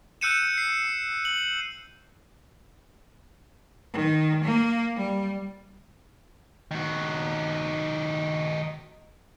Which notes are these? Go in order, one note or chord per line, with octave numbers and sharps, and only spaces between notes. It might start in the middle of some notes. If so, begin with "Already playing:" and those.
E6 F#6 G6 C#7 D#7 E7
C7
F#7
D#3
A#3
G3
D#3 F#4